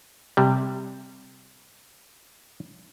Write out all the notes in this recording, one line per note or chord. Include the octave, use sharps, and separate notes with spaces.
C3 G3